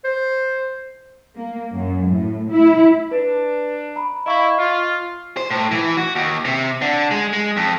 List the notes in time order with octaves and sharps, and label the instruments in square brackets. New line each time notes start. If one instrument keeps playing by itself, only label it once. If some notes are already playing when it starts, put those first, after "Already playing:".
[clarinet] C5
[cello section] A#3
F#2
A2
E4
[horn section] D4 [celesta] B4
[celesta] A#5 B5
[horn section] E4 [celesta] D#5 F5 C#6
[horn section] F4
[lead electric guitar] C5
A2
E3
F#4
D#2
C3
D3
G#3
G#3
F2